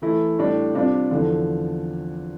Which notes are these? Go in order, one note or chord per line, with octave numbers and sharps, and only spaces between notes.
E3 A3 E4
A2 G3 D4
C3 G3 D4 F4
E2 D3 F3